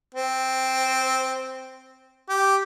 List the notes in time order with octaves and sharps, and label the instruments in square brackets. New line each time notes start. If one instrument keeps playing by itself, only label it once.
[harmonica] C4
G4